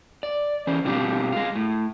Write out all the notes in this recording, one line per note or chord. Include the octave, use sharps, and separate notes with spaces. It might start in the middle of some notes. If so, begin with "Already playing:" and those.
D5
E3 C#4 C5
G2 B2 C4 D4 F4 G4
G#3 F4
A2